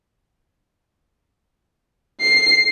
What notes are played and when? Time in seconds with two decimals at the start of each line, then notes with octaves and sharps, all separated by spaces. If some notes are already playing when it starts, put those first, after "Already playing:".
2.21 C7